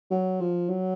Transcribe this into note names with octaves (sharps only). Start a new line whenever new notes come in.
F#3
F3
F#3